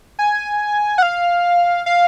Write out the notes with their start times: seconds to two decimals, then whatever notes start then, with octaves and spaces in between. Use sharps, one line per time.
0.19 G#5
0.98 F#5
1.02 F5
1.86 F5